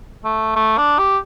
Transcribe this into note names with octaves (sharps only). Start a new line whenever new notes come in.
A3
A3
D4
G4